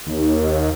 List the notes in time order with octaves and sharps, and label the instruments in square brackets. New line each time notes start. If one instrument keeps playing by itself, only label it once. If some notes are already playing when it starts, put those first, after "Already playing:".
[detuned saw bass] D#2